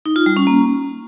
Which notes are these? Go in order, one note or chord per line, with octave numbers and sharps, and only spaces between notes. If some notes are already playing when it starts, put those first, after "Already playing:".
D#4
F4
G3
C#4
A#3